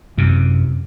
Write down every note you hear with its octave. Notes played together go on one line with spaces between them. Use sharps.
F#2 C3